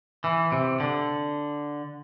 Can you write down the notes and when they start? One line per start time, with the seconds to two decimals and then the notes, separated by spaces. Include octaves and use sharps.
0.24 E3
0.52 C3
0.80 D3